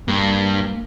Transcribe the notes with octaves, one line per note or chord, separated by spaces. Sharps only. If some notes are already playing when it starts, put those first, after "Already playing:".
G2 A#3